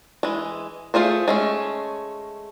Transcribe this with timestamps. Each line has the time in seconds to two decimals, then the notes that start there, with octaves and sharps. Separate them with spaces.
0.23 E3 G#3
0.94 A3 F4 G#4 C5
1.28 G#3 A3 C#4